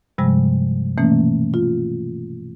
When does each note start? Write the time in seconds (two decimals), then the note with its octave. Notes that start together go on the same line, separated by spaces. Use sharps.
0.18 G2 C3 F3 G3 G#3
0.98 B2 E3 A3 A#3 C#4
1.54 F4